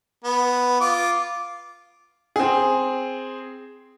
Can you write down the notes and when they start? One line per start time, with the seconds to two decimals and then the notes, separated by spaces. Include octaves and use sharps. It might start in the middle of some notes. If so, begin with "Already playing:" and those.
0.24 B3
0.81 F4 D6
2.36 C4 G#4